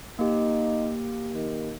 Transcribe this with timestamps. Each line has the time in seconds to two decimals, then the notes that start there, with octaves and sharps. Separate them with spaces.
0.19 A#3 D#4 G4
1.34 D#3